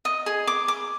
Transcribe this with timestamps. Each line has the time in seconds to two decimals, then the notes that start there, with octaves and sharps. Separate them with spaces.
0.05 D#5
0.26 G#4
0.47 D6
0.68 D6